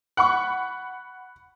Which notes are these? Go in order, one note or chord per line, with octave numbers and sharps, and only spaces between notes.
F#5 B5 C#6